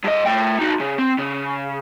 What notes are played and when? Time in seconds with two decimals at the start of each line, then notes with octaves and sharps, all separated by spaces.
0.04 G2 D#5
0.26 A3 G5
0.59 D#4 F#4
0.80 C#3
0.99 C4
1.19 C#3